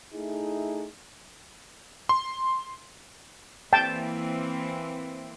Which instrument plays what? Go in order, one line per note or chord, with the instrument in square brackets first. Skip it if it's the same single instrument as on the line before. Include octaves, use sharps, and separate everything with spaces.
[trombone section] A3 D#4 E4 G#4
[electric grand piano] C6
[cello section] E3 A#3 C4 [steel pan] G5 A5